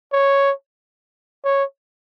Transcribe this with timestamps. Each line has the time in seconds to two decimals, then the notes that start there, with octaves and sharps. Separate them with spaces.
0.12 C#5
1.44 C#5